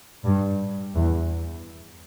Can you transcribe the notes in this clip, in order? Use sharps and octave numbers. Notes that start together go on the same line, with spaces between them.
G2
E2